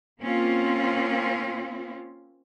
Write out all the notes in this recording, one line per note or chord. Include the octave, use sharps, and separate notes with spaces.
A#3 C4 C#4 F4